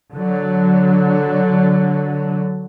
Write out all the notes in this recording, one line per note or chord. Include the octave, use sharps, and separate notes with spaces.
D3 F#3